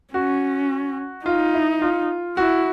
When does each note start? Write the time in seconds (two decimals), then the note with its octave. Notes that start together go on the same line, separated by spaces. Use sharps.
0.14 C#4 F#4
1.26 D#4 F4
1.54 E4
1.82 F4
2.37 E4 F#4